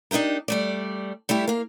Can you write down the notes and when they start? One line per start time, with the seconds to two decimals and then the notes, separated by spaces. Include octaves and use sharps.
0.11 D4 D#4 F4 G4 A#4
0.48 G3 A3 D5
1.29 G3 A3 E4 G4
1.48 A#3 F5